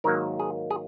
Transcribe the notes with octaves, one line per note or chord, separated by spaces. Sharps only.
G#2 D#3 F#3 A#3 A#4
G#4
G#4